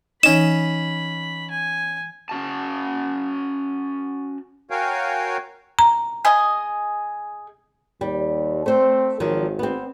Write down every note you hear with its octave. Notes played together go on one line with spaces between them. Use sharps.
E3 C#4 D#4 D#5 B5 E7
G#5
C#4 F#4 A5
F#4 A#4 C#5 F5 G5 G#5
A#5
G#4 D#5
D#2 G3
A3 C4 C5
G#1 D#3 F3 F#3
B3 C4